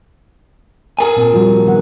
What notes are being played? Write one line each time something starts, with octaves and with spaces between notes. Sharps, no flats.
G#4 A#4 G#5
A#2 C4
F3 G3 F#4
D#3 B3 F#5